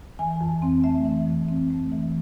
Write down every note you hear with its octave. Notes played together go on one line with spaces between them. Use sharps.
E3 G#5
F2
C4
A3 E5
E3
F2
C4
A3
E3